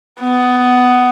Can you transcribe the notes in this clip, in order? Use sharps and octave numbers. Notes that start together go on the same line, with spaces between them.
B3